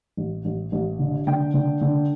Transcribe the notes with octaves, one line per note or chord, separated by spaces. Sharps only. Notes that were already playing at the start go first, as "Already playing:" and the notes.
A1
A1
A1
D3
D3 G5
D3
D3